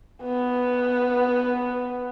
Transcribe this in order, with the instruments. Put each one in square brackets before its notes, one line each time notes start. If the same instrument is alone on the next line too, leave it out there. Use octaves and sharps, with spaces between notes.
[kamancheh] B3